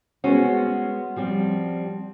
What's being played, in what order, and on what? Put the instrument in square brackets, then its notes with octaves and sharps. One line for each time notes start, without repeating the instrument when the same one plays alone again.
[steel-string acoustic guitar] G#3 B3 C5 [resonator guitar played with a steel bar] C#4 F#4
[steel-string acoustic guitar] F3 G3 C4